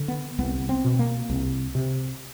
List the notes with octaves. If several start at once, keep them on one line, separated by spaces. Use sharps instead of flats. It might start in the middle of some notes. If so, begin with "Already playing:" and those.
Already playing: D3
B3
C2 B3
C4
B2
A#3
C2
C3